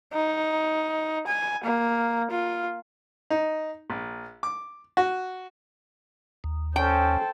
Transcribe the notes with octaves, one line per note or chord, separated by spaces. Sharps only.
D#4
G#5
A#3
F4
D#4
A#1
D6
F#4
D#2
C#4 A4 C5 G5